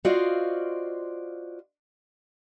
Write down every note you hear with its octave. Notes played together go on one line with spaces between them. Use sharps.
F4 F#4 C5 D5 D#5 F5